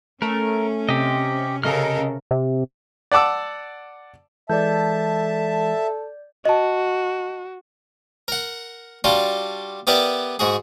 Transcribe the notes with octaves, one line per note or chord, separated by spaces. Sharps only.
A3 C#4 A#4
C3 G4 D#5
C#3 A4 A#4 D#5 F6
C3
D5 F#5 A5 D6 E6
E3 G#3 A4 D5 E5 A5 G6
F#4 D#5 A5
A#4 F#5
G3 D4 F4 F#4
B3 G4 A#4 B4 D5 E5
G#2 F#4 G#4